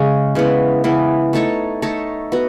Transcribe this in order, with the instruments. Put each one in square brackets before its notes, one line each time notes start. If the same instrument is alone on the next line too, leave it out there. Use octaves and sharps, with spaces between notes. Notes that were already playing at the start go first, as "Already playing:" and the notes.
Already playing: [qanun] C#3 G#3 C#4
C#3 E3 B3
C#3 E3 B3
A3 D#4 A4 C#5
A3 D#4 A4 C#5
B3 F#4